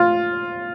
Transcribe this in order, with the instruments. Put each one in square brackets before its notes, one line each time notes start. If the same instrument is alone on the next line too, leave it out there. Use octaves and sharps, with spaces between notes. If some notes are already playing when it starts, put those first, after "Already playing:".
Already playing: [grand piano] F4